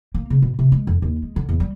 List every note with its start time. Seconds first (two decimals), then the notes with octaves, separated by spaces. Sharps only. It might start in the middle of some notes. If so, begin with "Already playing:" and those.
0.14 A#3
0.30 C#3
0.42 B2
0.59 C3
0.72 G#3
0.87 F2
1.02 D#2
1.22 G#3
1.36 D3
1.49 E2
1.60 G3